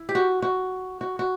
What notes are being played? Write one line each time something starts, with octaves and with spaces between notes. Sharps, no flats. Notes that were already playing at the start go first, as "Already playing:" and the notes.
Already playing: E4
G4
F#4
F#4
F#4
F#4